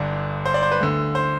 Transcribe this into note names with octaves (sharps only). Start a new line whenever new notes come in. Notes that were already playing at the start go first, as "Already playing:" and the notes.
Already playing: G1 G2 D3 D5
C5
D5
C5
B4
D2 D3
C5